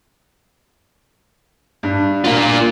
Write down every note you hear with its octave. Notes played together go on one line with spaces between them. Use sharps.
G2
A#3 F4